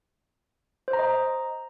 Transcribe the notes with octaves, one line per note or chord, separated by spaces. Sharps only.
C5
A#5
D#5
A#5